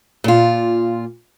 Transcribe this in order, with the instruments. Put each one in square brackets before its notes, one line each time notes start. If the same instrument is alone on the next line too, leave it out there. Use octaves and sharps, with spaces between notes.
[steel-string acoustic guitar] A#2 F4